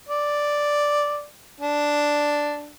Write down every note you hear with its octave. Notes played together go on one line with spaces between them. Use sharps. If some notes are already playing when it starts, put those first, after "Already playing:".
D5
D4